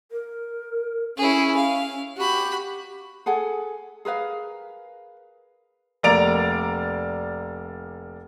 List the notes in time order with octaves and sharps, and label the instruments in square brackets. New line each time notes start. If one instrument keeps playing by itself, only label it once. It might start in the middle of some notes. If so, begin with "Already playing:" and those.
[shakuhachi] A#4
[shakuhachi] C#4 [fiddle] E4 G#4
[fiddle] F5
[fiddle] F#4 B5 [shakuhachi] G4
[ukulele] G#4 A4 F#5 G#5
G#4 A#4 B4 F5
[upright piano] F1 A#3 D5 A#5 D7 F7